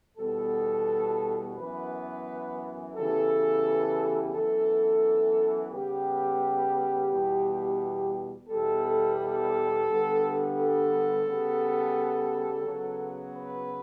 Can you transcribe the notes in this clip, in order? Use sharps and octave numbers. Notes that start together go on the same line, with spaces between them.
E2 B2 G3 B3 A4
F#2 E3 B3 B4
C#3 E3 G3 B3 A4
F#2 E3 B3 A4
C#3 G3 B3 G4
E2 B2 G3
E2 B2 G3 A4
A4
G2 D3 G3 B3
A4
C#3 G3 B3
C#3 F#3 B3
B4